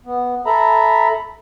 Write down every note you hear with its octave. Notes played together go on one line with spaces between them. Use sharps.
B3
A4 E5 A#5 B5